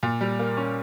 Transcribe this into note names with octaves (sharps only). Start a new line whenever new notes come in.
A#2
G3
A#3
C#4